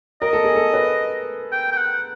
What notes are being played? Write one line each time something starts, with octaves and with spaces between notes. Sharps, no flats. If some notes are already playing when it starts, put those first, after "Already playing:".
A#4 D#5
A4
G#4
A4
B4
G5
G5
F#5